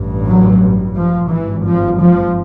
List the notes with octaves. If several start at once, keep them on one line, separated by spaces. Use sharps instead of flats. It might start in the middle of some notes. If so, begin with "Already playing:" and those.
Already playing: A1 G2
F#3
F3
G#1 G2 E3
F3
F3